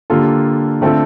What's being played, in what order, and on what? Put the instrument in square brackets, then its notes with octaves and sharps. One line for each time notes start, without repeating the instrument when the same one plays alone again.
[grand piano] D3 G3 A#3 F4 A4
D3 A3 C4 F4 A4